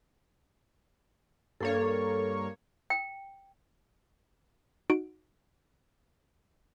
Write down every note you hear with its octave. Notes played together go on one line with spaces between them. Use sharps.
G2 A#3 A4 C#5
G5
D#4 F#4 D7